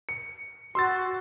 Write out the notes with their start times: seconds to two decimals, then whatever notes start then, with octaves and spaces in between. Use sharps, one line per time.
0.09 C#7
0.75 F#4 C6 E6 A6